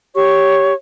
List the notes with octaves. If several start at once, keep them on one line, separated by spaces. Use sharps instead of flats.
G4 C#5 C#6